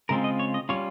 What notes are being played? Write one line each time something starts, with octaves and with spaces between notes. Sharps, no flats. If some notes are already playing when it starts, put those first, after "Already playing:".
C#3 G#3 C4 F4 A#4
D#5
C#5
D#5
G3 C#4 F4 C#5